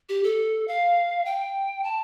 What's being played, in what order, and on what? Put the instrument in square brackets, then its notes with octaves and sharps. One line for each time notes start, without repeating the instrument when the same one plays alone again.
[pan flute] G4
A4
F5
G5
A5